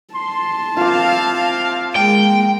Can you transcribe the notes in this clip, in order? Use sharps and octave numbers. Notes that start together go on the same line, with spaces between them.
A5 C6
C4 F4 E5 F5 D6
G#3 A#3 G5